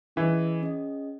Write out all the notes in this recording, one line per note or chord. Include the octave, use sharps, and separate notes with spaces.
E3 C#4 G#4 D#5
C#4 G#4 D#5